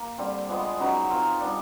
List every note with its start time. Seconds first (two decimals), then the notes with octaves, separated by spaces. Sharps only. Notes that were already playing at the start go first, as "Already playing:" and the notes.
Already playing: A#3
0.18 D3 G3 C4
0.49 F3 G#3 B3
0.79 C#3 F#3 B3 D#4
1.10 C4 F4 A#4
1.40 G3 B3 D4